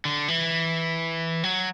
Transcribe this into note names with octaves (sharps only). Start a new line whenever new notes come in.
D3
E3
F#3